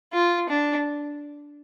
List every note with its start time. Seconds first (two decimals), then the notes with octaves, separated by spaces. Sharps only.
0.13 F4
0.49 D4